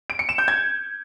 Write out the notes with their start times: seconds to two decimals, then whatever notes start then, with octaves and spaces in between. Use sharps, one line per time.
0.10 D7
0.19 C#7
0.29 E7
0.38 G6
0.48 G#6